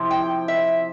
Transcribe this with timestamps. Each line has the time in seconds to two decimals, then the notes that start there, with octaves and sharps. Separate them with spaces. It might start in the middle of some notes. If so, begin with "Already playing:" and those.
Already playing: C3 F3 E4
0.11 G5
0.48 E5